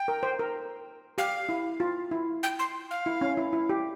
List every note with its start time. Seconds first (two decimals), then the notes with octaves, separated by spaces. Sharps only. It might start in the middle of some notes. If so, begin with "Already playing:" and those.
Already playing: G5
0.08 A#4
0.23 C5
0.40 A#4
1.18 G4 F5
1.49 E4
1.80 F4
2.11 E4
2.43 G5
2.59 C6
2.91 F5
3.06 E4
3.21 C#4
3.37 E4
3.53 E4
3.69 G4